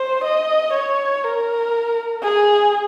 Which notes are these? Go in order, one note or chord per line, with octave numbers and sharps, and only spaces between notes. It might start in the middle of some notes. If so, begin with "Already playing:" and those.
Already playing: C5
D#5
C#5
A#4
G#4